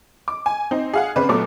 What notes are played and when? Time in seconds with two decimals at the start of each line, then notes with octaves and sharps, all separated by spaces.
0.28 D6
0.46 G#5
0.71 C4 D#4
0.93 G#4 F5 F#5
1.16 C#3 C4 D4 B4
1.29 A#2 F#3 A3 B3 A4 D6